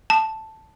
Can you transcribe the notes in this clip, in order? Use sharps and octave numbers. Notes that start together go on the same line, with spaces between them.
A5